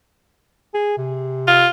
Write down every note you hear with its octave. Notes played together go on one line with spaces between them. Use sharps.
G#4
C3
F4